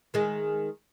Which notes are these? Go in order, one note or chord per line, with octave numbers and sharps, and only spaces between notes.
D#3 G#3